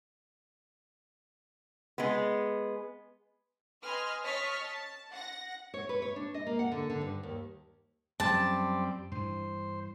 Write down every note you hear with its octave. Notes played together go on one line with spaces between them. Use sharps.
G#3 B3
B4 D#5 G#5 C6 F6
C#5 D#5 A5 C#6 F6 B6
A5
F#5 A#6
C#5
B4
C#5
D4
D#5
A#3
F#5
D3
D3
G2
D#2
F#2 F3 G3 C4 D5 A5
G2 E3 C5